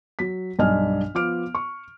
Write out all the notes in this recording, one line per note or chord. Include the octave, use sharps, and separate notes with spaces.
F#3 B6
B1 G2 D4 D#5 G#5 F6
F3 B3 D6 F6 D7
C#6